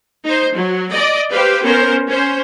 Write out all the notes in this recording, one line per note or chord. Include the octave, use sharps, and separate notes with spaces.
D#4 C5
F#3
D5 D#5
G4 B4 C5 F5
B3 C#4 A#4 C5
C#4 C5